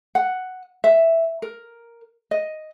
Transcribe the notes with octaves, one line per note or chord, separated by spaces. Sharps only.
F#5
E5
A#4
D#5